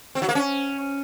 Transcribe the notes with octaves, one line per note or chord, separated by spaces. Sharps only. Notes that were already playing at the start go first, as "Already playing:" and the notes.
C4
F#3
A#3
C#4